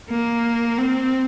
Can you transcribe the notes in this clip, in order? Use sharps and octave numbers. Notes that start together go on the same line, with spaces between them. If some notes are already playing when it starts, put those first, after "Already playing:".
A#3
C4